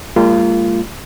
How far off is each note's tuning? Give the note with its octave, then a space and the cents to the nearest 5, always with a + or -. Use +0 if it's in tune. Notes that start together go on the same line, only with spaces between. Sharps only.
G3 +40 A#3 -30 F4 -25